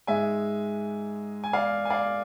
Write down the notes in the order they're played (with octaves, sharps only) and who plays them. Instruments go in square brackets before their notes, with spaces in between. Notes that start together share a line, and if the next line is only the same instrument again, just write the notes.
[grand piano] G#2 G#3 E5 G#5
G#5
D5 F5
G#5
D5 F5